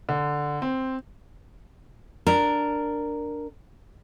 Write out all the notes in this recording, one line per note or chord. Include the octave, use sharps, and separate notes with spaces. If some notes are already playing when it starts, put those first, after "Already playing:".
D3
C4
D4 A#4